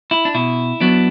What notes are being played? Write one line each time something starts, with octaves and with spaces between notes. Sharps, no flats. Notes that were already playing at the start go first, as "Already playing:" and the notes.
E4
D4
B2 E4
F#3 B3 D4